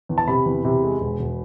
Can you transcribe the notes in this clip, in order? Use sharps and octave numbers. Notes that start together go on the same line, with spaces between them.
E2
A5
C3 B5
E2
C3
G#3
E1
E1